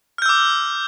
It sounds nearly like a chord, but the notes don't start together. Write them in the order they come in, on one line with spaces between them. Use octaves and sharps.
F6 G6 E6 D6